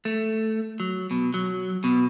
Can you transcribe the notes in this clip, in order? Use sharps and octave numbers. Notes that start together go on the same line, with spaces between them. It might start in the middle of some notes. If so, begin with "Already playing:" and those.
A3
F#3
B2
F#3
B2